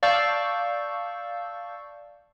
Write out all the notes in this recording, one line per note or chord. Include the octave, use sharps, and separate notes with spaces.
D5 F5 A5 C#6 E6 G6